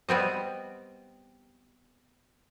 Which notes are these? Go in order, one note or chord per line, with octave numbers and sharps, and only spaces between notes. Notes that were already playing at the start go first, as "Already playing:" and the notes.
G3 B3 C4 D#5